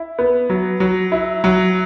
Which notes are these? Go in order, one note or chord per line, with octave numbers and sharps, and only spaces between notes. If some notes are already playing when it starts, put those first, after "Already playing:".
Already playing: E4
B3
F#3
F#3
E4
F#3